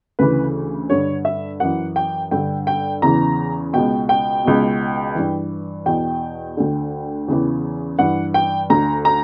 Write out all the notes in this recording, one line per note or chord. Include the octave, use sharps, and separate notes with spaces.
D2 C#3 E3 B4
G2 D3 C#5
E5
F#2 E3 F#5
G5
G2 D3 G5
G5
E2 C#3 E3 A#5
C#2 B2 G5
G5
C#2 B2
G2 E3
E2 B2 G5
D2 D3
E2 C#3 E3
G2 E3 F#5
G5
D2 D3 A#5
A#5